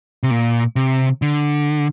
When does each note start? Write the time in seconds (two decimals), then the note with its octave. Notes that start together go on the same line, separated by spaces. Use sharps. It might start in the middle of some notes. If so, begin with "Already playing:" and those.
0.23 C3
0.31 A#2
0.76 C3
1.22 D3